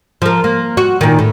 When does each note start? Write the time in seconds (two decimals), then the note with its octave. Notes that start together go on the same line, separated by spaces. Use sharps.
0.22 F3 A#4
0.44 A#3
0.77 F#4
1.01 A#2 D#3
1.19 A2